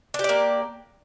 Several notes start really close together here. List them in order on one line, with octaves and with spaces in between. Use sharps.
D4 G4 D5 A#3